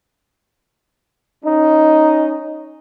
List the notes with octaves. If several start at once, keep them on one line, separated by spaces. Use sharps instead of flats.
C#4 D#4